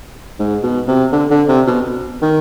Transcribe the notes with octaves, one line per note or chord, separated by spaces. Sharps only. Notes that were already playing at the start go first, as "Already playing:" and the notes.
G#2
B2
C3
D3
D3
C3
B2
D#3